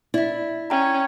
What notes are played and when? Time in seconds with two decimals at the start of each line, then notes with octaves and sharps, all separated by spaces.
0.14 E4 D5 E5
0.70 C#4 G5 A#5